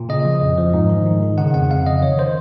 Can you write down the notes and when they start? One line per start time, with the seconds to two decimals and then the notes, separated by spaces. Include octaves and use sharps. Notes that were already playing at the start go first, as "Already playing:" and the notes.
Already playing: A#2
0.09 C#3 D#5
0.25 F3
0.41 F2
0.58 F3
0.73 G#2
0.90 D#3
1.06 G#2
1.23 D#3
1.38 C#3 F#5
1.54 F2 F#5
1.70 F2 F5
1.86 C#3 D#5
2.02 D#3 C#5
2.18 D#3 C5